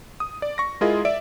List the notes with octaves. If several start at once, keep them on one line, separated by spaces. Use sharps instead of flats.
D#6
D5
C#6 A#6
G#3 E4 F4 G#4 A#4 D#5
D5 E5 D7